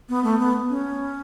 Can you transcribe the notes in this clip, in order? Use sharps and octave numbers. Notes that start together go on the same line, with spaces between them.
B3
A3
B3
C#4